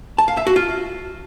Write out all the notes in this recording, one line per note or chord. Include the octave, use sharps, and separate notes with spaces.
A5
F5
E5
F#4
F4